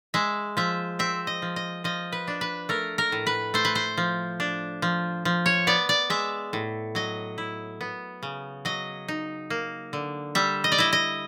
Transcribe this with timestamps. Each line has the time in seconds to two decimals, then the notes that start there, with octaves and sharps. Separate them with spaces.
0.14 G#3 E5
0.57 F3 E5
0.99 C4 E5
1.27 D#5
1.42 F3
1.56 D#5
1.84 F3 D#5
2.12 B4
2.28 D4
2.41 B4
2.69 A3 A#4
2.98 A#4
3.12 A2
3.27 B4
3.54 A3 C5
3.65 B4
3.75 C5
3.97 F3
4.40 D4
4.82 F3
5.25 F3
5.46 C#5
5.67 B3 D5
5.89 D5
6.10 G#3 E5
6.53 A2
6.95 F#3 D#5
7.38 E4
7.81 B3
8.23 C#3
8.65 F#3 D#5
9.08 D#4
9.50 A#3
9.93 D3
10.35 G3 E5
10.64 D#5
10.72 D5
10.78 E4 D#5
10.93 D#5